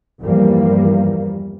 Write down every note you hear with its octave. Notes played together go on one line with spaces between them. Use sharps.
E2 G2 E3 F3 G3 A#3